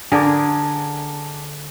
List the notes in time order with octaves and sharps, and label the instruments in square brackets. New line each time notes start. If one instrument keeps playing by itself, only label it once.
[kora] D3 G#4 A#4 [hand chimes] G#5 A5 D6